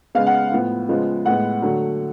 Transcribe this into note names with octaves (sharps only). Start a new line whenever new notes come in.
C#3 G#3 B3 F5
F#5
A2 F3 B3
C#3 F3 G#3 B3
A2 G#3 B3 F#5
D3 F#3 A3